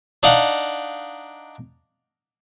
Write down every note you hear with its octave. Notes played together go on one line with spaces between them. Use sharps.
D4 D#4 F5 F#5